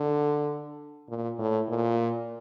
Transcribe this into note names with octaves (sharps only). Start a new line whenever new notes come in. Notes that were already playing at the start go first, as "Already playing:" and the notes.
Already playing: D3
A#2
A2
A#2